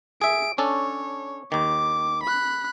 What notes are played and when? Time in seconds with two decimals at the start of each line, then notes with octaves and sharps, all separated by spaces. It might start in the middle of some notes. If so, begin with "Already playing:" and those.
0.22 G#4 E5 D7
0.58 C#4 D4 A4 C#5
1.52 D#2 D#3 D6
2.23 B5 F#6